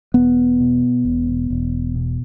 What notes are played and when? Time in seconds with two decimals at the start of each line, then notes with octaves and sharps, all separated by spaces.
0.14 E1 B3
0.60 B2
1.05 E1
1.50 E1
1.95 B2